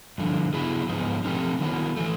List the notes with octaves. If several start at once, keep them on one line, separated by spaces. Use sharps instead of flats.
G2 D3 F3
C#3 F#3 B3 E4 G#4
G#2 F3 G#3 B3
F3 A3 C4 D#4 G4
D#3 F#3 B3 E4
E3 A3